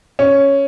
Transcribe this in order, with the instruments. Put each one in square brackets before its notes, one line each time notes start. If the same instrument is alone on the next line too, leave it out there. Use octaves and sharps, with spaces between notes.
[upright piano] C#4